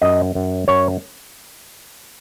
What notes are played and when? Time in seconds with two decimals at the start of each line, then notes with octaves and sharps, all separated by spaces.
0.01 F#2 D#5
0.35 F#2
0.68 F#2 C#5